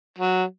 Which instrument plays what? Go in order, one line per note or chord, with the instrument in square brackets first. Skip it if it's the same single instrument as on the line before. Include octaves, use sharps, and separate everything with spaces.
[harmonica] F#3